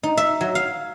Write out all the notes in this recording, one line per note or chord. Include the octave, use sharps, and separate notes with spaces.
D#4
E5
F#3
F5